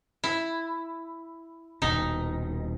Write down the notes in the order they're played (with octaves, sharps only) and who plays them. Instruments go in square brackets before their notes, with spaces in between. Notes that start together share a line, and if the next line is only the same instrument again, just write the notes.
[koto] E4
[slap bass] D#1 B2 [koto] D#4